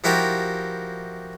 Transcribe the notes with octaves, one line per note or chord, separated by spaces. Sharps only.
F3 E4 F#4 G4 A#4 A5